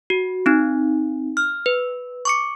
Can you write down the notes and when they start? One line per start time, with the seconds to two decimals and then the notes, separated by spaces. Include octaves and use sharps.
0.10 F#4
0.46 C4 D#4
1.37 F6
1.66 B4
2.25 C#6 D6 C#7